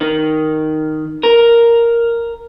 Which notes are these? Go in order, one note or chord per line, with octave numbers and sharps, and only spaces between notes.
D#3
A#4